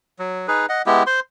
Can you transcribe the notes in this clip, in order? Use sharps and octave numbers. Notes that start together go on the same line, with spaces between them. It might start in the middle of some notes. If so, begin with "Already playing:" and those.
F#3
D#4 G#4 B4
D#5 F#5
G#3 B3 E4 G4
C5 C6